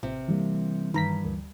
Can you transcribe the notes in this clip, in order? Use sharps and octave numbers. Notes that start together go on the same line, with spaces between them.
A1 C3
E3 G3 A#3
G2 D#3 A#5 B6
D2